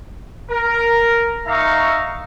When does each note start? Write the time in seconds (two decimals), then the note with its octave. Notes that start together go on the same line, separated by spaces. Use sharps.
0.50 A#4
1.46 D#4 E5 F5 A#5 C#6